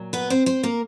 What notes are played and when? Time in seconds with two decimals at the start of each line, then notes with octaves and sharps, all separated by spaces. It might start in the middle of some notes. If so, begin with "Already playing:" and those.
Already playing: A#2 F#3
0.13 B3 B4
0.30 C4 C5
0.46 C4 C5
0.63 A#3 A#4